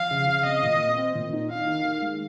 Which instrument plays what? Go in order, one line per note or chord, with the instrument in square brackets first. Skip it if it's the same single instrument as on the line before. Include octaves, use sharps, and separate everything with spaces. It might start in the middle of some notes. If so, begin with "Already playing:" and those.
Already playing: [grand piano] F3 [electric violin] F5
[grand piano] C#3
C#3
[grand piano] C4 [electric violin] D#5
[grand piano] A#2
C4
C4
A#2
D#4
[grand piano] D#4 [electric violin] F5
[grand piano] D#3
D#3
G#3